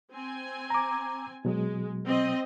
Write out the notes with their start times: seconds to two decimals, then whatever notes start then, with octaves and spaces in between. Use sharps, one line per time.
0.12 C4 G#5
0.70 A#5 D6
1.45 B2 F#3 G#3
2.05 C4 D#5